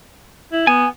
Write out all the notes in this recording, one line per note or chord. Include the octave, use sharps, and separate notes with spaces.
E4
B3 G#5